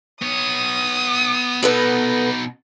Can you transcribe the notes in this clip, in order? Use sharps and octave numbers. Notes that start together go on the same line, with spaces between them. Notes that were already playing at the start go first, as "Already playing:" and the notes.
B3 C#5 D#6
B2 B3 D#4 A4 B4